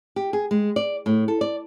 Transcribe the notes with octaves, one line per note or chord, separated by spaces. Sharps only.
G4
G#4
G#3
D5
A2
A4
D5